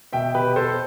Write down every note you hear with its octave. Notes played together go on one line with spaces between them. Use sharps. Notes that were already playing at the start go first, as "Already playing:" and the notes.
B2 E5 G5
B2 G4 B4
B2 A4 C5